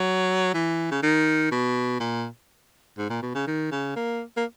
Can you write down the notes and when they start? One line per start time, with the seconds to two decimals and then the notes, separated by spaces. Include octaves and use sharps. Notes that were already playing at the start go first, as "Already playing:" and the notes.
Already playing: F#3
0.54 E3
0.91 C#3
1.03 D#3
1.52 B2
2.00 A#2
2.98 G#2
3.10 A#2
3.22 B2
3.35 C#3
3.47 D#3
3.71 C#3
3.96 A#3
4.37 A#3